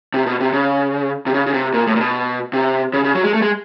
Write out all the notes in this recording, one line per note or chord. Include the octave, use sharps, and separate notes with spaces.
C3
B2
C3
C#3
C3
C#3
C#3
C3
A#2
A2
A#2
B2
C3
C#3
C#3
F#3
G#3
A3
G#3